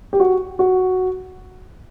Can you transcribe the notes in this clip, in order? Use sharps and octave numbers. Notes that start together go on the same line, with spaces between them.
G4
F#4
F#4